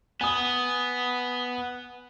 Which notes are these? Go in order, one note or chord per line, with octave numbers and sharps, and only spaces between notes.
B3 G#5 D#6